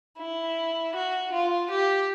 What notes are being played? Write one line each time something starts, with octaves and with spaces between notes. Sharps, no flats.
E4
F#4
F4
G4